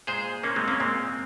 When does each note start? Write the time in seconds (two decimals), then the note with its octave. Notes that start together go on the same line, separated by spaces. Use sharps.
0.07 A#2 G#3 G#4 C5
0.43 A#2 G#3 A#3 C#4
0.56 G#3 C4
0.68 A#3 C#4
0.80 A#2 G#3 C4